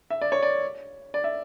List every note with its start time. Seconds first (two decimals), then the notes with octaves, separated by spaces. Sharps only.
0.10 E5
0.21 D5
0.32 C#5
0.43 D5
1.14 D5
1.24 E5